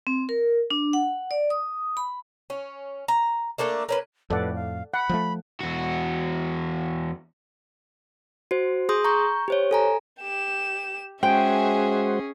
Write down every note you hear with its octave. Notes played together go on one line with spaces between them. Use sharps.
C4
A#4
D4
F#5
D5
D#6
B5
C#4
A#5
A3 A#3 D4 A4
A#3 C#4 B4
F2 A2 A4 B4 D5 F#5
F5
F#5 B5
F3 G#3 A3
E2 F#4
F#4 C5
G#4 C6 D#6 G6
A#5 C#6 G6
G4 C5 C#5
A4 G#5 A#5
G4 E7
G#3 C#4 F#4 G#4 C5 E5 G5 G#5